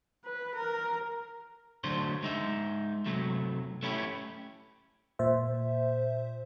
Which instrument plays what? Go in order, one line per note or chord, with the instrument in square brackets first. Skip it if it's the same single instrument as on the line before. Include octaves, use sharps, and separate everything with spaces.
[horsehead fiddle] B4
A#4
[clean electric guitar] D3 F#3 A3 D4 C5
G#3 D#4 E5
C3 F#3 A3
A3 C#4 E4 G4
[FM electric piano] A#2 C5 E5